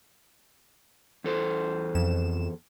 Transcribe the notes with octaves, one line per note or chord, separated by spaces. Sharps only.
E2 A4 C5
F2 E7